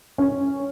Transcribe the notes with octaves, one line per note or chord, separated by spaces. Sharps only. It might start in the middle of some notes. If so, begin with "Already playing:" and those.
C#4